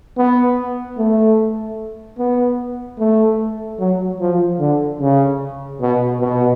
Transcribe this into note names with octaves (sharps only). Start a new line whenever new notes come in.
B3
A3
B3
A3
F#3
F3
D3
C#3
B2
B2